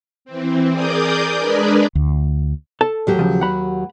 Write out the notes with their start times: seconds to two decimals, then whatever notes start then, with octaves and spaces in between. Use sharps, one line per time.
0.25 E3 C4
0.70 G#4 A#4 D5 D6 D#6 G6
1.37 G#3 D4 G#4 A#4 B4 D5
1.95 D2
2.81 A4 A5
3.07 D#2 F#3 G4
3.19 C#3 F3
3.41 F#5 B5